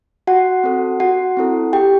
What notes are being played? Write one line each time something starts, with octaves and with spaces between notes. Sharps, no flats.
F#4 F#5
C4 F#4 A4
F#4 F#5
C4 E4 A4
G4 G5